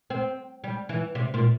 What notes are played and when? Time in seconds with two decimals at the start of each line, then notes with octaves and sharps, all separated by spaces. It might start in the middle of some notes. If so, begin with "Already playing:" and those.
0.10 C4
0.64 G3
0.89 E3
1.15 C3
1.34 A#2